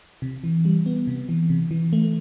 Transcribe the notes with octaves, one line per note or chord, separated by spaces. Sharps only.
C3
E3
G3
B3
C3
E3
C3
E3
A3